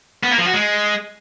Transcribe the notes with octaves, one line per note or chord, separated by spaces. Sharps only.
B3
A#3
F3
F#4
G#3